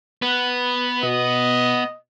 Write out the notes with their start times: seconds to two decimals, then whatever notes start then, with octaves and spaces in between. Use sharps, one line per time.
0.22 B3 B4
1.03 B2 D#5